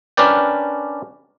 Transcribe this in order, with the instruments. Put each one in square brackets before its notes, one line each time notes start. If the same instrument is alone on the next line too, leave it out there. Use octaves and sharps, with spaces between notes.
[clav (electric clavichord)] C#4 D4 A#4 B4 D5 G5